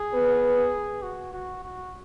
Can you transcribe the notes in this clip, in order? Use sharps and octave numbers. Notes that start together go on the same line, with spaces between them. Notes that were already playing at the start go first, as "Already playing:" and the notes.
Already playing: G#4
B3 B4
F#4
F#4
F#4